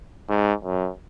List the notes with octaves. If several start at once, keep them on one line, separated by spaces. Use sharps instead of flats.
G#2
F#2